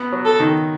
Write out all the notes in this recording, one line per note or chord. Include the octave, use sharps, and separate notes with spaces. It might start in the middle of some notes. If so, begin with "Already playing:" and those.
Already playing: B3
F#3
A4
D#3